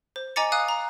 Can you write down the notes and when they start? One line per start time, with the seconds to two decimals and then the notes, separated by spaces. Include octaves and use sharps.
0.16 C5
0.36 D#5 G#5 A#5 D6 A6 C#7
0.52 F5 G#5 D#6 F#6
0.68 A#5